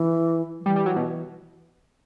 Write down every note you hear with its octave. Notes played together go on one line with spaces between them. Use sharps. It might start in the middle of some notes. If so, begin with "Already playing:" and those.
Already playing: E3
F#3
E3 G3
G3
F#3
B2